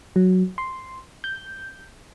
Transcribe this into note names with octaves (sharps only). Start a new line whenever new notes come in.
F#3
C6
G6